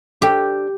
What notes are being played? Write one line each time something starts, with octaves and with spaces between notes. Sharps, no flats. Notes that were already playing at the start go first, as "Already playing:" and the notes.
D4 G4 A4 C5 G5